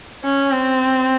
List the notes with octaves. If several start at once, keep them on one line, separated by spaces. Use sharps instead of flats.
C#4
C4